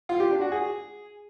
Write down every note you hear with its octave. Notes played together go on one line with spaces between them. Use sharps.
F4
G4
D4
F#4
G#4